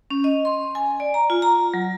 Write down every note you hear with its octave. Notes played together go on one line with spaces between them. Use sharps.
C#4
D#5
C6
G#5
D5
A#5
F4
A#5
F#3